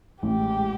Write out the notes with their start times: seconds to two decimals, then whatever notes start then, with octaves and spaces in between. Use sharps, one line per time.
0.23 A1 G4
0.39 G#3
0.54 G#3